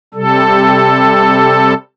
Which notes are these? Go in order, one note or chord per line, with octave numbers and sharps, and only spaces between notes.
C3 G3 A4